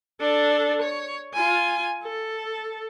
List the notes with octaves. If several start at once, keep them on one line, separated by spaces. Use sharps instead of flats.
D4 A4
C#5
F4 G#5
A4